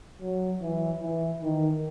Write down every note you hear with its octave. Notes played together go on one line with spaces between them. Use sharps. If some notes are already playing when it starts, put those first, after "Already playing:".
F#3
E3
E3
D#3